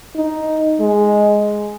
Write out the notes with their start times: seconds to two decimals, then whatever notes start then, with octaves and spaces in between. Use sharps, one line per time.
0.16 D#4
0.81 G#3